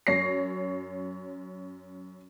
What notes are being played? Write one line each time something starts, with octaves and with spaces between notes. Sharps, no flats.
F#2 C#5 A#6 C7